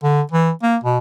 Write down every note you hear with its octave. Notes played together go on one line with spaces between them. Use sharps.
D3
E3
A#3
B2